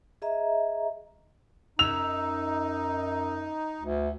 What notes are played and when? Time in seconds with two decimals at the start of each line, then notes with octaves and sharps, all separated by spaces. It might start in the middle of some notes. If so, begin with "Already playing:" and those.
0.22 G#4 D#5 E5 A#5
1.79 F#2 D#4 E6 F7
3.81 D2